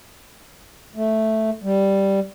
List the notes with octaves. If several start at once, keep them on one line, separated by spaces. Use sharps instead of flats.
A3
G3